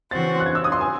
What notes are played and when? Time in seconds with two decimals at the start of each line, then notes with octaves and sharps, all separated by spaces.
0.11 C#3 E3 C4 F#4 C5 A6
0.40 F#6
0.46 G#6
0.55 E6
0.64 D#6
0.72 C6
0.81 G#5